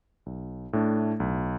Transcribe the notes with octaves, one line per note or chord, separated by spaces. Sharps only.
B1
A2 A3 D4
B1